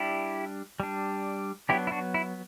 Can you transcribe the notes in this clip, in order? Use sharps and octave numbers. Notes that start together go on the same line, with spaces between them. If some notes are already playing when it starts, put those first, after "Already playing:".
Already playing: G3 D4 E4 G4
G3 D4
F#3 B3 D4 E4 G4
E4
D4 F#4
E4